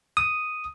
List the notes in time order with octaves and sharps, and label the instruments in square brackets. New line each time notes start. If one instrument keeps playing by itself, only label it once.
[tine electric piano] D#6